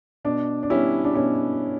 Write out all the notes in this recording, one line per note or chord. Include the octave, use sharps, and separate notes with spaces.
B2 D4
D4
G3 B3 C#4 E4
D4
B2 C#4 E4